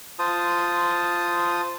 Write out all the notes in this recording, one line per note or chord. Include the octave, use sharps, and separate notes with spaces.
F4 C5 A5 D#6